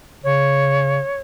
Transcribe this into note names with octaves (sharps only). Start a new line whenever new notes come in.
C#3 C#5